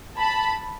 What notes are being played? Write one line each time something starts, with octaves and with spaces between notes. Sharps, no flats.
A5 B5